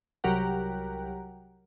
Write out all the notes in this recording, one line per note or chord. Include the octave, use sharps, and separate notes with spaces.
C2 F#3 G4 A#4 F#5